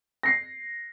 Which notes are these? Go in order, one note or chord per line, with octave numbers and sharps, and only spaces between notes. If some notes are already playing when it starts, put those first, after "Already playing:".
A#6 C7